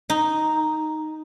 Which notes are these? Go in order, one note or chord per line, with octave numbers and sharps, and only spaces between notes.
D#4